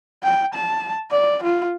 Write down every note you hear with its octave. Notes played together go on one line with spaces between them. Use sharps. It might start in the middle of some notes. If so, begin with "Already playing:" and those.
G5
A5
D5
F4